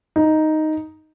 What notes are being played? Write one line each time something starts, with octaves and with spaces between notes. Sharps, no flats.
D#4